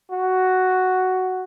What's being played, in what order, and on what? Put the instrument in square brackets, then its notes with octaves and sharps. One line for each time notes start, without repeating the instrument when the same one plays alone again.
[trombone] F#4